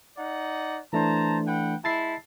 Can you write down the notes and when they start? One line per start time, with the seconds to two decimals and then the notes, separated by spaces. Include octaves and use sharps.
0.17 D#4 D5 F#5
0.93 E3 A3 D4 C5 A5 A#5
1.48 B4 F#5 G5
1.84 G#3 E4 A5 A6 C7